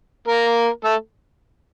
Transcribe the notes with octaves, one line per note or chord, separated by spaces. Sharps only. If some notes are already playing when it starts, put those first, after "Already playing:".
A#3 A#4
A3 A4